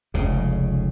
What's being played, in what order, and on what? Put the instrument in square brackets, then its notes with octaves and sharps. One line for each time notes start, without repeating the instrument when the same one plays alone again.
[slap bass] F1 C#2 C#3